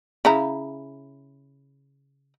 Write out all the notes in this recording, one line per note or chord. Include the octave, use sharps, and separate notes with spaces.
C#3 E4 A#5